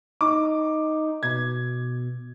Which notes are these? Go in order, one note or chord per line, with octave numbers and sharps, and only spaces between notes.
D#4 D6
B2 G#6